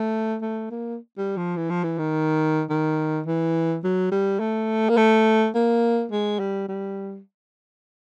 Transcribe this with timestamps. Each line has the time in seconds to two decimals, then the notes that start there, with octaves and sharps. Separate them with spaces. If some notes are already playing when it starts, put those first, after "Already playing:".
Already playing: A3
0.41 A3
0.71 A#3
1.17 G3
1.37 F3
1.56 E3
1.70 F3
1.84 E3
1.98 D#3
2.70 D#3
3.26 E3
3.84 F#3
4.12 G3
4.40 A3
4.89 A#3
4.97 A3
5.55 A#3
6.12 G#3
6.39 G3
6.68 G3